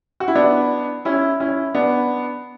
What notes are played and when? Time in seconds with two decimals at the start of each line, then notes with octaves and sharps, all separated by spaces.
0.20 F#4
0.28 E4
0.35 B3 D4
1.05 C#4 E4
1.40 C#4 E4
1.75 B3 D4